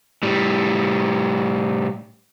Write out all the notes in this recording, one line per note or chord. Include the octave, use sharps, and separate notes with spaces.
A2 G3